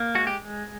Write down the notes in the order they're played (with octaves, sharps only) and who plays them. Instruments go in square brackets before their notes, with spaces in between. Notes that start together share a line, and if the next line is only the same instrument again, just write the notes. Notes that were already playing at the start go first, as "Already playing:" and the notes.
Already playing: [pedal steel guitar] A#3
G#3 F#4
G4